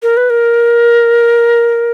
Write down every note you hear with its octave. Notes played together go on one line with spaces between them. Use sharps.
A#4
B4
A#4